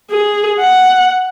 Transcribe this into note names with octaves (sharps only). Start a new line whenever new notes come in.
G#4
F#5